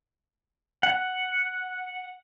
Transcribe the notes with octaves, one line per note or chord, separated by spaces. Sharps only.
F#5